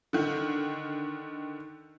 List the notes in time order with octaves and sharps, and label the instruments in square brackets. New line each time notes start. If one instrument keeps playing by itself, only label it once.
[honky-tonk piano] D3 D#3